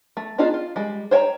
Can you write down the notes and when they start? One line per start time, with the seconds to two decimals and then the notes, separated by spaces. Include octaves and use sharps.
0.17 A3
0.38 B3 D4 D#4 F4 G#4
0.54 F4
0.76 G3 G#3
1.11 C5 C#5 G5 G#5 A#5